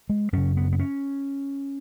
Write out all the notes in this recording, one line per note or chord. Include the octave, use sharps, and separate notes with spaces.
G#3
F#2 C#3 C#4
B3
B3
C#4